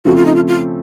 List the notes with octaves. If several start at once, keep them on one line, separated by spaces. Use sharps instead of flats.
C#3 F3 A3 C4 F#4
F4
D#4
F4
F4